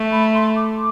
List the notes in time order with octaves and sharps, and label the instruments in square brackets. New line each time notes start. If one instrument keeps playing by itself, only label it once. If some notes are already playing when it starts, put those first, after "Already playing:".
Already playing: [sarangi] A3
[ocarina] B5
C6
D6